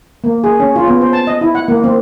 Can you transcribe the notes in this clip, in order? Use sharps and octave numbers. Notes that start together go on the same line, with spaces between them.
A#3
G#4
C#4
F4
B3
C5
A5
D#5
E4
F#5
A#3
C4